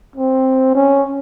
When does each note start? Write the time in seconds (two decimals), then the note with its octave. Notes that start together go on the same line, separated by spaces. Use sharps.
0.16 C4
0.75 C#4